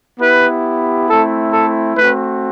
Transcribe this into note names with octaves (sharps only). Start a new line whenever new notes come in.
B3 E4 G4 B4
A3 C4 E4 A4
A4
A3 C4 F#4 B4